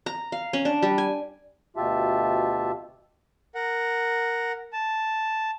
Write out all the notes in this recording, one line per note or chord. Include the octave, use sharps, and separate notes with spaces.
A#5
F5
C#4
D4
G3
G#5
D2 B2 F4 G4 E5 A5
A#4 F#5
A5